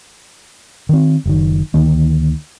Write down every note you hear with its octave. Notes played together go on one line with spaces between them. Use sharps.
D#3 C4
F#1 D#3
D2 D#3 A#3